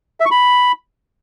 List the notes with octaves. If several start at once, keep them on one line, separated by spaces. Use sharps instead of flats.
E5
C#6
B5